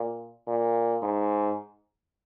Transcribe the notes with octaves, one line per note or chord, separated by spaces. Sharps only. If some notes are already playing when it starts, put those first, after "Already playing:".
Already playing: A#2
A#2
G#2